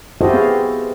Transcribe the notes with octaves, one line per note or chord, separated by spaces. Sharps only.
E4 F#4 G4 A4 C5 D#5
B3 C4 G#4 F5